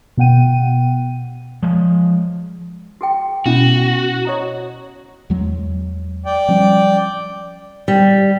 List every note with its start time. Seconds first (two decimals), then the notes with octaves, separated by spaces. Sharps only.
0.17 B2 B3 F#5 G5 D#7
1.63 F3 G#3
3.01 F#4 G#4 G5
3.46 B2 C#4 E4 F#4
4.25 C#5 D#5 A#5
5.30 E2 F#3 G#3
6.26 D5 G5
6.48 F3 G3 C#4
7.88 G3